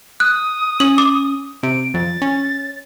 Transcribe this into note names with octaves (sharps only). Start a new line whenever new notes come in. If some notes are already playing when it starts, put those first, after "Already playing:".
D#6 F#6
C#4 F#7
D6
C3 D7
F2 A6
C#4